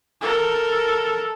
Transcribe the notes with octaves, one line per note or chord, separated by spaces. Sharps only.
A4 A#4